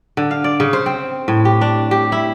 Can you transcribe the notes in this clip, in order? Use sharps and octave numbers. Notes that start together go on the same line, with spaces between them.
D3
F5
D5
C#3
C5
C4
A2
G4
D4
G4
E4